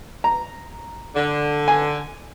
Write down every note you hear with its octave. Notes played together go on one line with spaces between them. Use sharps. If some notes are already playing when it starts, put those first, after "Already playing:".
A#5
D3
G#5